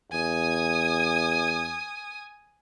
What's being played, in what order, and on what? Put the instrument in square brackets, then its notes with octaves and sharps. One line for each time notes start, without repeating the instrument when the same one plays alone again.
[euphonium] E2 [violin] G#5 D#6